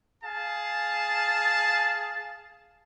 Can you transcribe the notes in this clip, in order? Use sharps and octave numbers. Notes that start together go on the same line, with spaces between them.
G#4 F5 A5